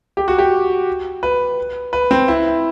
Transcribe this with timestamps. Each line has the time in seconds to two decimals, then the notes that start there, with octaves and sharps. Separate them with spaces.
0.17 G4
0.28 F#4
0.38 G4
1.23 B4
1.93 B4
2.11 C4
2.28 E4